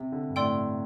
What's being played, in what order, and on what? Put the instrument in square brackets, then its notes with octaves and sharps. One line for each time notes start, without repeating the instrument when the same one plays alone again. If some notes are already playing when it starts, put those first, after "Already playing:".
Already playing: [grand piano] C3
D3
G2
[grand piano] A2 [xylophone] D5 G5 C6 E6